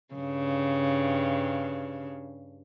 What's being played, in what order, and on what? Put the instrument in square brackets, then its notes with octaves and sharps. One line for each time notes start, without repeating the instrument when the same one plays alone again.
[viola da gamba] G2 C#3